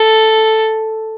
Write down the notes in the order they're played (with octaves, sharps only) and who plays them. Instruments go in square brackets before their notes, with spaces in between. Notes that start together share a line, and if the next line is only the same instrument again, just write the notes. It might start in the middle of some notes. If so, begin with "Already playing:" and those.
Already playing: [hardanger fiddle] A4